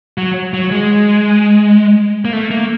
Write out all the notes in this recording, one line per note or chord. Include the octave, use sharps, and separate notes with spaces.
F#3
F#3
G#3
A#3
A3
A#3